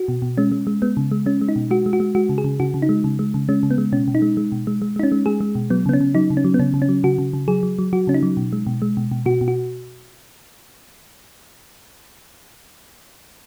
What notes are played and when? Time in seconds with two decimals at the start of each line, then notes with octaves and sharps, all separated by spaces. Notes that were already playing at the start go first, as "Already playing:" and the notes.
Already playing: F#4
0.08 B2
0.22 B2
0.38 G#3 C#4
0.52 G#3
0.67 G#3
0.82 G#3 B3
0.97 C#3
1.11 G#3
1.26 G#3 C#4
1.41 G#3
1.49 D#4
1.56 B2
1.71 G#3 F#4
1.86 G#3
1.93 F#4
2.00 G#3
2.15 G#3 F#4
2.29 C#3
2.38 G#4
2.44 C#3
2.60 C#3 F#4
2.74 C#3
2.82 D#4
2.89 G#3
3.04 C#3
3.19 G#3
3.34 C#3
3.49 G#3 C#4
3.63 C#3
3.71 B3
3.78 G#3
3.92 B2 C#4
4.08 B2
4.15 D#4
4.22 G#3
4.37 G#3
4.52 B2
4.67 G#3
4.82 G#3
4.96 G#3 D#4
5.03 C#4
5.12 G#3
5.26 G#3 G#4
5.41 G#3
5.55 B2
5.70 F#3 B3
5.86 C#3 B3
5.93 C#4
6.01 C#3
6.15 F#3 D#4
6.30 C#3
6.37 C#4
6.44 F#3
6.54 B3
6.59 C#3 C#4
6.74 C#3
6.82 C#4
6.89 F#3
7.04 C#3 F#4
7.18 C#3
7.33 C#3
7.48 F#3 G#4
7.63 F#3
7.79 F#3
7.93 F#3 F#4
8.07 C#3 C#4
8.14 D#4
8.23 F#3
8.37 B2
8.53 G#3
8.67 B2
8.82 G#3
8.97 B2
9.12 B2
9.26 B2 F#4
9.41 B2
9.48 F#4